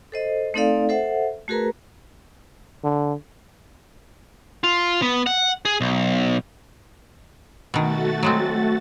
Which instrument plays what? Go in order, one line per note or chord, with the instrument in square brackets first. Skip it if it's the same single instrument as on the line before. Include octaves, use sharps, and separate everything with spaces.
[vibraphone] A4 C5 D#5
A3 C4 D#4 A4 D5 F5
A4 C5 E5 F#5
A3 F#4 G#4 A#4 B4 A#5
[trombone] D3
[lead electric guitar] F4
B3
F#5
G#4
B1
[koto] B2 D#3 [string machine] A3 F#4 A6
[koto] F#3 G#3 C4